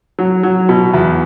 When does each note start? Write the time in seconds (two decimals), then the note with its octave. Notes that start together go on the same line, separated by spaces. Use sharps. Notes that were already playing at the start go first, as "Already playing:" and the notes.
0.19 F#3
0.43 F#3
0.69 B2
0.94 E2